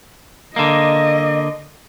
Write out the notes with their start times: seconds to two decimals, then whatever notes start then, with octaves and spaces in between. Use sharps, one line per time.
0.56 D3 A#3 D#5